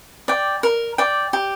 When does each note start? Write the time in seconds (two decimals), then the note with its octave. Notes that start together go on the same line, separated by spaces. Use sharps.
0.28 D5 G5
0.63 A#4
0.98 D5 G5
1.33 G4